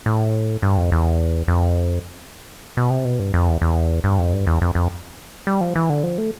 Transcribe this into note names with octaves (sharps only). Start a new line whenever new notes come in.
A2
G2
F2
E2
F2
B2
C3
B2
G2
F2
E2
E2
G2
F2
G2
E2
F2
F2
G3
F3
E3
D3
F3
A3